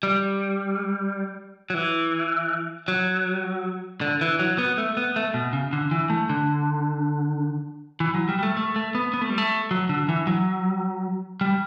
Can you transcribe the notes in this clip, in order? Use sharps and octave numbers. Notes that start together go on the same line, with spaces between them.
G3
F#3
E3
F#3
D3
E3
F#3
B3
A3
B3
A3
B2
C#3
D3
E3
A3
D3
E3
F#3
G3
G3
A3
A3
A3
B3
B3
A3
G3
A3
F#3
D3
E3
F#3
G3